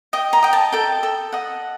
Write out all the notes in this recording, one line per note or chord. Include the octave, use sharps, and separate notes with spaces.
D#5 G5
A#5
D#5 G5
A5
A4 G5
A4
D#5 F#5